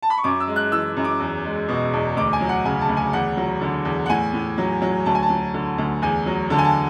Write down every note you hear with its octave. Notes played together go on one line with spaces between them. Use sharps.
A5
B5
C#6
F#2 D6
E6
G#3
F#6
E3 E6
F#2
D6
E2
G#3
B2
E2
D2 D6
G#5
F#3
F#5
C#3 G#5
A5
D2
G#5
E2 F#5
F#3
D3
E2
F#5
A2 G#5
A2
F#3
F#3
D2 A5
G#5
A5
F#3
D3
D2
E2 G#5
F#3
D3 A5
G#5
A5